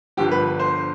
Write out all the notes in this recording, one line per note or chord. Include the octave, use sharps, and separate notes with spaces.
G1 G2 D3 F3 G4
B4
C5